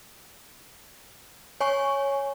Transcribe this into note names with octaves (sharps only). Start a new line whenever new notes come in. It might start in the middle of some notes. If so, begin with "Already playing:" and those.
C#5 G#5 C#6